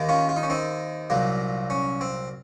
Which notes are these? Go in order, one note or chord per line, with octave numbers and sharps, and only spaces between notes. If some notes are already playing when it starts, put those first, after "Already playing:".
Already playing: D#2 D#3 A#3
C#4 F4
F4
D#4
C#4
C4 D#4
C2 A#2 F#3 A#3
C#4
C4